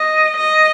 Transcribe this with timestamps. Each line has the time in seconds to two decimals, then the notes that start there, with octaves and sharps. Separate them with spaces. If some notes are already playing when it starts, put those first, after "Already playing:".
Already playing: D#5
0.37 D#5